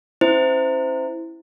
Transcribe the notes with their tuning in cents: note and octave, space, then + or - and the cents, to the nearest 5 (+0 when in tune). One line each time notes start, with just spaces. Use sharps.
C#4 -35 E4 +0 C5 -20